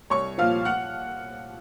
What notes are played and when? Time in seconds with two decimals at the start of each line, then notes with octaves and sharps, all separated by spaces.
0.10 C2 C#5 C#6
0.38 A#2 F3 F5 F6
0.65 F#5 F#6